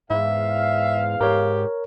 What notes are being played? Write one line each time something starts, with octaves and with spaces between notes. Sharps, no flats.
E2 G#2 E5 F5
G#2 G4 A#4 C#5